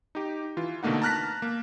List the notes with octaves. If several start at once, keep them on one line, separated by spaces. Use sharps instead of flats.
D#4 G4
E3 F4
B2 D3 A3 A#3 D#4 F#5
A5 A#5 F6 F#6 A#6 B6
A#3